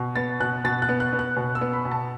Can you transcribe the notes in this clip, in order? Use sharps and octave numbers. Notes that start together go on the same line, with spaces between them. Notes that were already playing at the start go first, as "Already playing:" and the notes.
Already playing: B2
B3 A6
B2 F#6
B2 A6
F#6
B3
F#6
B3
F#6
B2
E6
B3
B5
B2
A5